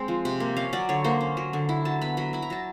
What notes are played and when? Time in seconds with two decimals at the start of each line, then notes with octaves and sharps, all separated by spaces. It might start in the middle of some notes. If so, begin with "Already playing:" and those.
Already playing: G#3 C4
0.08 F3
0.25 C3
0.40 A#3
0.57 C#4 F5
0.73 F#3 D5
0.89 D3 C#5
1.04 A#3 C5
1.21 C#4
1.37 F#3
1.53 D3
1.69 E4
1.85 F#3 A5
2.01 B3 B5
2.17 F#3 B5
2.33 E4 B5
2.42 A#5
2.50 F#3 A5